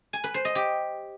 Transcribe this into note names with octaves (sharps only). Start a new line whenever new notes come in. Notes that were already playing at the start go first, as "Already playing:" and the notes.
G#5
B4
C5
D#5
G4